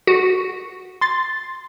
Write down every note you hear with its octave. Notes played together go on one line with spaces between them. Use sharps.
F#4
C6 A6